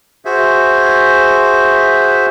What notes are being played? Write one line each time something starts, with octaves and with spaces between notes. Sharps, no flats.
F#4 G#4 C5 E5